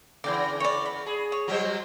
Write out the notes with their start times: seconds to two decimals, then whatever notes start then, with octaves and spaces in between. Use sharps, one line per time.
0.24 C#3 E3 D5 G5 C6
0.60 C#5 D5
0.86 B5
1.06 G#4
1.32 C#5
1.48 F#3 G3 C5